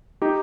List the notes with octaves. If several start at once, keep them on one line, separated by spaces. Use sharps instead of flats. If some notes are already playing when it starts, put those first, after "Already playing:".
D#4 G4